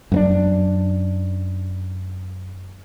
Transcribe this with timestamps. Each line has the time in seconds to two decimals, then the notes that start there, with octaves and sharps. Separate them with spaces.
0.12 F#2 B3 D4